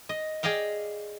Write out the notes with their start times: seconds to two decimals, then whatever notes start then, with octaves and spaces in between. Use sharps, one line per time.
0.09 D#5
0.43 G#4 D5 D#5 F5 G5